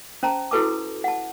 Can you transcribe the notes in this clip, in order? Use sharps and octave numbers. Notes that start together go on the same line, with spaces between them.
C#4 C5 A5 A#5
E4 F#4 A4 B4 A5 D6
F#5 A5